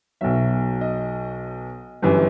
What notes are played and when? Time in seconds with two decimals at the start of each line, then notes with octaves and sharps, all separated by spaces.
0.21 B1 B2 F#3 E5
0.81 D#5
2.02 G1 F#2 E3 G3